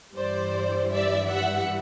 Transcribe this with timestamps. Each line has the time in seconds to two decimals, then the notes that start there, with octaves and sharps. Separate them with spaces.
0.16 G2 E3 G3 C5 D5
0.92 D5 E5
1.29 E5 F#5